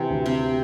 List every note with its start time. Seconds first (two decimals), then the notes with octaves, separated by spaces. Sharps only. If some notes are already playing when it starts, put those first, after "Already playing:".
Already playing: C3 E3 C4
0.10 D2
0.26 C3 C4